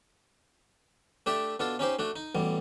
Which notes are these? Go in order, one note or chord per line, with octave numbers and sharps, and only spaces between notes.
A3 D4 G4 D5 E5
B2 D4 F4 A4
C#4 D#4 G4 C5
A3 D4 F#4
D#4
A1 B2 G3